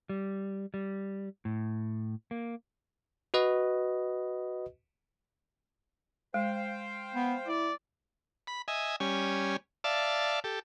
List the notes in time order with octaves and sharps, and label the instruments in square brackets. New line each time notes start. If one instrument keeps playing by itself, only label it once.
[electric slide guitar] G3
G3
A2
A#3
[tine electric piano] F#4 B4 D#5
[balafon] G#3 [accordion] C5 F5 G5
[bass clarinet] B3
[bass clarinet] E4 [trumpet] D5
[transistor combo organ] B5
D#5 E5 G#5
G3 C#4 G#5
D5 E5 F5 A5
G4 A4